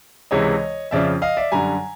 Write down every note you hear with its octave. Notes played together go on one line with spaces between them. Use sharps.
C#2 C3 E3 G#3 C#5 D#5
F2 C#3 F3 D5 E5
D#5 F5
D5 E5
F#2 D3 G3 G#5 A#5